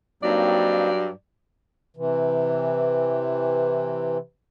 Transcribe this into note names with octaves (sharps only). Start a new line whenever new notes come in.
G2 F#3 A#3 C4 D#4 D5
C3 E3